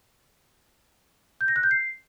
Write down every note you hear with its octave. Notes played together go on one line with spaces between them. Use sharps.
G6
A#6
F#6
G6
C7